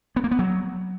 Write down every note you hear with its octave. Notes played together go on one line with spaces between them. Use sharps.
B3
A#3
B3
F#3